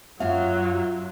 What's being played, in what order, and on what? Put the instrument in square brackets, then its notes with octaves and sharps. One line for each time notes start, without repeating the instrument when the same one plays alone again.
[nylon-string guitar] F#2 F5 [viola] F#3 [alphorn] F4 [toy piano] E5